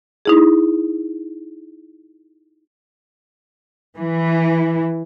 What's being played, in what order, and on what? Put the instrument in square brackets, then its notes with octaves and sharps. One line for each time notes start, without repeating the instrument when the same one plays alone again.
[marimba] D#4 E4 G#4
[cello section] E3